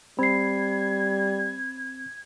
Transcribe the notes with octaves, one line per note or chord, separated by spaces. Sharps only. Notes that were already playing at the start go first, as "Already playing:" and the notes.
G3 C4 B5 G#6 C7